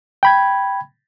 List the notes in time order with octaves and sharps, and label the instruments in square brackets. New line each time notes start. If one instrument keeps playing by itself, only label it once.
[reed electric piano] G5 B5 G#6